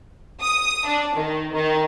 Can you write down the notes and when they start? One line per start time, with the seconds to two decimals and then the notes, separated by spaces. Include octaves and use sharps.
0.42 D#6
0.85 D4
1.16 D#3
1.53 D#3